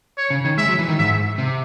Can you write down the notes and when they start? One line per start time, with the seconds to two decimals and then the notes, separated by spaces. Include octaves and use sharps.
0.18 C#5
0.30 C#3
0.45 D#3
0.58 G#3 E5
0.68 F#3
0.79 E3
0.88 D#3
0.98 G#2 E5
1.38 C3